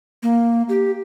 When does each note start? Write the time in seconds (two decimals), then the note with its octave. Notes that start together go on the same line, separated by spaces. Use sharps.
0.23 A#3
0.69 G4